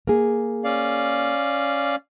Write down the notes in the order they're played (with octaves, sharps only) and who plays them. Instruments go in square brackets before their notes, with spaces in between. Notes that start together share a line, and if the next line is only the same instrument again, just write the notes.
[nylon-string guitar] A#3 G#4
[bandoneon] C#4 D5 F5